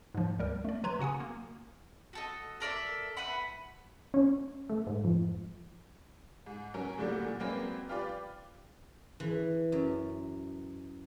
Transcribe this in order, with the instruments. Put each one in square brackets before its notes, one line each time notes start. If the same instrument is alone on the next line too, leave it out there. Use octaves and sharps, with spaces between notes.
[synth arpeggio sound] G#2 F3
D2 G3 A#4
A3 D5
F#3 B4 A#5 C6 G#6
C#3 F#4 F#5 G#5 D#6
A#3
[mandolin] F#4 A4 D#5
A4 A#4 D5 E5
B4 E5 F#5 B5
[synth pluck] C#4
A3
G#2
F2
[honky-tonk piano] G#2
F#3 C#4 A#4
A2 D3 F#3 G3 A3 A#3
A#2
F#3 G#3 A#3 C4 B4 D5
F4 G4 B4 D5
[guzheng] E3
F#2